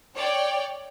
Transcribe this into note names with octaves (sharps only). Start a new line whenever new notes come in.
C#5 D5 G5